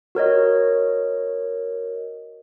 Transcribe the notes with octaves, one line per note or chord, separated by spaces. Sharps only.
F#4 A#4 C#5 D#5